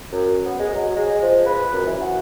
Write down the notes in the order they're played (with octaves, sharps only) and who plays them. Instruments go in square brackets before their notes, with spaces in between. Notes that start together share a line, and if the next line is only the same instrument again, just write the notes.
[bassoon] F#2
B3
G#3
F#3
G#3
F3
B4
F#2
E3
F#4